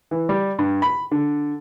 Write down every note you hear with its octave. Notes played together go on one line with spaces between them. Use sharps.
E3
G3
G2
B5
D3